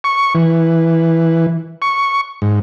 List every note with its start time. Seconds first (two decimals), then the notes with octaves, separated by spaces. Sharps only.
0.04 C#6
0.35 E3
1.82 C#6
2.42 G#2